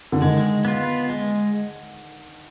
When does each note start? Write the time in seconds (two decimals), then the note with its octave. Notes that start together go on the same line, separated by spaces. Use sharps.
0.12 D3
0.21 D#3 G#3
0.65 B3 F4
1.09 G#3